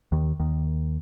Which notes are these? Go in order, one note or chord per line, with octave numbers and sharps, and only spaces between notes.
D#2 D#3
D#2 D#3